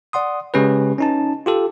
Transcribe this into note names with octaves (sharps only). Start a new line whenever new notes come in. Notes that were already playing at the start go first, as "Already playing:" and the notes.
D5 F#5 C6 D#6
C#3 G#3 C#4 G4 B4
C#4 D#4 A5
F4 G4 A4